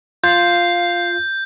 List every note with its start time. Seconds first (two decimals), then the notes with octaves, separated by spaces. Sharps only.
0.24 F4 F5 G6